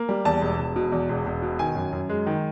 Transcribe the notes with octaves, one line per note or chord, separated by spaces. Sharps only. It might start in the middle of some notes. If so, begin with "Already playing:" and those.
Already playing: A#3
G3
E2 A5
E1
E1
B2
E2
E1
E1
B2
D#3 G#5
F#2
F#2
G#3
D#3